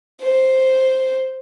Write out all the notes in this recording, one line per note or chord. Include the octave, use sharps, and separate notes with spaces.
C5